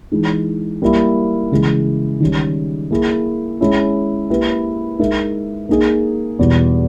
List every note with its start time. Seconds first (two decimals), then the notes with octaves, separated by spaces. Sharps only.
0.12 E3 G#3 D#4
0.82 G3 A#3 E4
1.51 C#3 E3 G#3
2.20 D#3 G3 C#4
2.91 A#3 E4 G#4
3.61 G#3 C#4 E4
4.30 A#3 E4 G4 B4
4.99 G#3 D#4 A#4 E5
5.69 A#3 D#4 G#4
6.39 E2 B2 G3